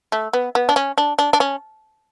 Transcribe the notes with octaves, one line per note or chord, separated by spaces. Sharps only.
A3
B3
B3
D4
C#4
D4
D4
D4
C#4